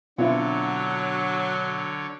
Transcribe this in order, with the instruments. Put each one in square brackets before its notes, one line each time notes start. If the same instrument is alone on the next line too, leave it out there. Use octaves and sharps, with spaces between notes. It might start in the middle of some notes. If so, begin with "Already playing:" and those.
[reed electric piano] B2 D4 [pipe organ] D3 C#5 [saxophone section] F#3 [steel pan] C4 E4 F4